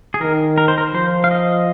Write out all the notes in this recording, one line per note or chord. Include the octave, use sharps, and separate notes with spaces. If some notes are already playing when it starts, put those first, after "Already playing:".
G#4
D#3 A#4
A#4
C5
A#4
F3 C5
F5
D#5